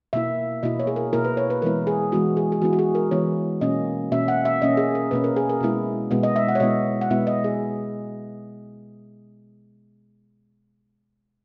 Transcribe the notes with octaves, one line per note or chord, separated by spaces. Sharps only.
B2 A#3 E4 E5
B2 A#3 E4 D#5
C#5
G#4
A#4
B2 A#3 E4 A#4
B4
C#5
B4
E3 G#3 B3 E4 A#4
G#4
E3 G#3 B3 E4 F#4
G#4
G#4
E3 G#3 B3 E4 F#4
F#4
G#4
A#4
E3 G#3 B3 E4 C#5
B2 A#3 C#4 D#5
B2 A#3 C#4 E5
F#5
E5
B2 A#3 C#4 D#5
G#4
A#4
B2 A#3 C#4 B4
A#4
G#4
A#4
B2 G#3 B3 E4
B2 G#3 B3 E4
D#5
E5
F#5
C#5
B2 G#3 B3 E4 D#5
F#5
B2 G#3 B3 E4 E5
D#5
G#4